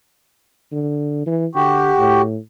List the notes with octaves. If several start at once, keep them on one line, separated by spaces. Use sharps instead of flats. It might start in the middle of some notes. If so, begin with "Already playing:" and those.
D3
E3
D3 F#4 G4
A2